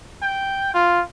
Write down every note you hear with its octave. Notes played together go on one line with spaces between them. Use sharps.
G5
F4